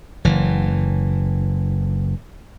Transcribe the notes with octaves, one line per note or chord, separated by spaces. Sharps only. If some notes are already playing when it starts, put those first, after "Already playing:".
F#1 E3